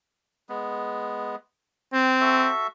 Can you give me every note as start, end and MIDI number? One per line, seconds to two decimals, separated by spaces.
0.49 1.36 56
0.49 1.36 59
1.93 2.48 60
1.93 2.17 79
2.20 2.67 66
2.20 2.67 69
2.20 2.67 76